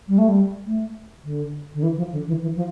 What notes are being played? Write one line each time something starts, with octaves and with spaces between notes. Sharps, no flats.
G3
A3
G3
A3
D3
D3
E3
F3
D3
E3
E3
F3